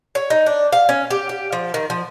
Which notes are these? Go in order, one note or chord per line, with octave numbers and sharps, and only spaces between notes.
C#5
D#4
D4
F5
C#4
G4
G4
F3
D#3
F3